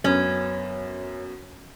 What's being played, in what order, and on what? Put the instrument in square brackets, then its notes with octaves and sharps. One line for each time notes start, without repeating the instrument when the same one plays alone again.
[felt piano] F#2 B3 [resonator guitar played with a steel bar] C#4